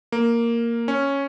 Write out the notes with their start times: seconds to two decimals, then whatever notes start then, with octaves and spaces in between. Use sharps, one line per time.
0.12 A#3
0.88 C#4